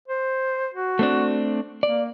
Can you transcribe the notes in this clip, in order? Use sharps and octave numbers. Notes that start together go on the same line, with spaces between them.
C5
F#4
A3 C4 D4
A#3 D5